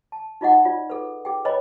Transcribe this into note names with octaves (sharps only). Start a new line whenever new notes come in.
A5
D#4 F4 D#5 F#5
F4 D5
G#4 A4 B4
G#4 G5
B4 C#5 D#5 G#5 B5